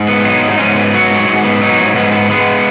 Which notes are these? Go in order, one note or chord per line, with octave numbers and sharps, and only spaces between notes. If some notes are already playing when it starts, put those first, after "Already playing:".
Already playing: G#2
B3
F#3 D#4
G#2
D#4
G#2 C#4
B3
F#3 F#4
G#2
G#2
B3
F#3 D#4
G#2
G#2 B3
B3
G#3 B3